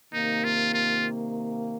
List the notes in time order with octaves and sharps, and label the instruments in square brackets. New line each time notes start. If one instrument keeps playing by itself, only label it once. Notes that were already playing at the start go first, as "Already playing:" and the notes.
[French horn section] C3 D#3 A#3 [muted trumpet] D#4
[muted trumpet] F4
F4